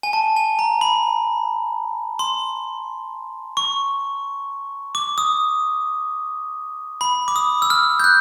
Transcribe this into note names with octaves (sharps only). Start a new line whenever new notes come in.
G#5
A5
G#5
A#5
B5
C6
C#6
D6
D#6
B5
D6
D#6
E6
F6
G6
F#6